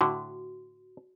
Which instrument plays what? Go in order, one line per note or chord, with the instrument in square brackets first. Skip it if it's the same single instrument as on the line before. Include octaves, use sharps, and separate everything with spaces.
[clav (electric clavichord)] A2 D3 [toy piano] F#4